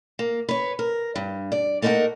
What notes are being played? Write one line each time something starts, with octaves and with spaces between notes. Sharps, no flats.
A#3
B4 C#5
A#4
G2
D5
A3 A#3 D#4 G4 A#4 F#5